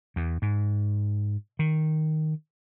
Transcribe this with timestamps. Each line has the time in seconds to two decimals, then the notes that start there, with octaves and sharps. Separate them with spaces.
0.16 E2
0.42 G#2
1.59 D#3